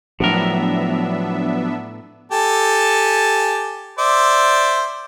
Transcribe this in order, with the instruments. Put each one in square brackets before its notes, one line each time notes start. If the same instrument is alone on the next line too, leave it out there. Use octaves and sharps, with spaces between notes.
[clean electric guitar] A2 A#4 [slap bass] F3 F#3 [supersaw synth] B3 D4 E5
[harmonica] G4 A4 G#5
C5 D5 E5